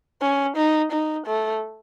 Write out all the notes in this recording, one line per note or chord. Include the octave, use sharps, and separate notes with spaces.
C#4
D#4
D#4
A3